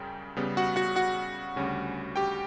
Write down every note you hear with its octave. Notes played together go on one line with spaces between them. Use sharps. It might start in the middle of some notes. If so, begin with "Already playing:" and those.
Already playing: F#2 C#3 G3 C#4 G5
C#3 G3 B3
F#4 F#5
F#4 F#5
F#4 F#5
D2 C#3 G3 C#4
G4 G5